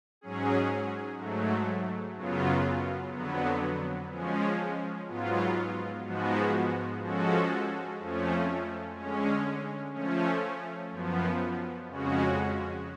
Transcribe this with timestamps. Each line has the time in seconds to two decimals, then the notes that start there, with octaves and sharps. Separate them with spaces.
0.21 G#2 F#3 C#4 G#4
1.18 G#2 F#3 A3
2.15 F#2 C#3 F#3 B3 F4
3.13 F2 D3 F#3 B3
4.10 F3 G#3 C#4
5.07 G#2 F#3 B3 F4
6.05 G#2 F3 G#3 B3 F#4
7.02 F3 G#3 C#4 F#4 A4
7.99 F2 F3 A3 C#4
8.96 D3 G#3 C#4
9.93 F3 A3 C#4
10.91 F#2 F3 B3
11.88 F2 C#3 G#3 C#4 F#4